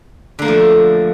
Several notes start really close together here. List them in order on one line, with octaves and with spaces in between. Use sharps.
D3 A#3 A3 F3